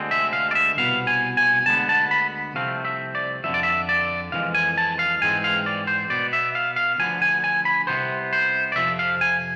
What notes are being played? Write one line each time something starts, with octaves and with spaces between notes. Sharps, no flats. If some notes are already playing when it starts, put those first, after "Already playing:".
Already playing: D2 D3 G#3 C4
E5
F5
D5
E5
C2 B2 B3 F5
G#5
G#5
D2 D3 G#3 B3 A5
A5
B5
C2 C3 F3 A3 C4 F5
E5
D5
F2 D3 F3 E5
D5
E5
D5
F2 E3 G#3 F5
G#5
A5
F5
G#2 E3 G#3 C4 G#5
F5
D5
C5
B2 B3 D5
E5
F5
F5
D2 D3 F3 B3 G#5
G#5
G#5
B5
C2 C3 F3 B3 C5
C5
D5
F2 C3 F3 E5
F5
G#5